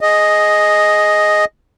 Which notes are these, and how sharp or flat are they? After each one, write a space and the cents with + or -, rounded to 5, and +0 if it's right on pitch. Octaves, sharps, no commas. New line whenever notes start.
G#4 +10 D#5 +0